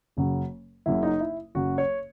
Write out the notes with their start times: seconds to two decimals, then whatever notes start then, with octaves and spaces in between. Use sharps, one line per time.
0.17 F#1 F#2 C#3 F#3
0.86 F#1 F#2 C#3 F#3 E4
1.03 D#4
1.20 E4
1.55 F#1 F#2 C#3 F#3 F#4
1.78 C#5